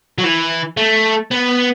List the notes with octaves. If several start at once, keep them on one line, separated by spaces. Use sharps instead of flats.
F#3
E3
A3
B3